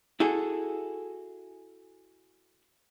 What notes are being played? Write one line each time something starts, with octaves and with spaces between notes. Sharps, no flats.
E4 F#4 G#4 A4